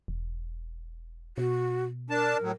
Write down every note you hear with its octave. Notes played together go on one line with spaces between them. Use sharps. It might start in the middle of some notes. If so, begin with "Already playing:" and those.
E1
B2 F#4
D4 A#4 A5
A2 F#3